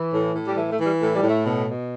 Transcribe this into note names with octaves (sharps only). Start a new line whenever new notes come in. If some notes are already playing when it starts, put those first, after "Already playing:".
Already playing: E3
A2
A2
G3
E3 A3
A3
E3
G3
A2 A3
G3
A2
A3
B2
B2